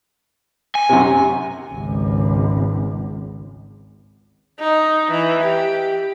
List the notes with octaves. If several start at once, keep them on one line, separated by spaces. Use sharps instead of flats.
G#5
F#2 C3
G#1 C#2
D#4
E3
G4